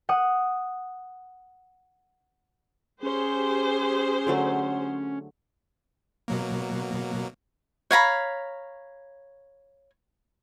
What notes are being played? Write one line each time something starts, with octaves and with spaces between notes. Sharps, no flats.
F#5 D#6
C#4 G4 G#4 C5
D3 F#3 A3
B2 F#3 A#3
C#5 F5 A#5 B5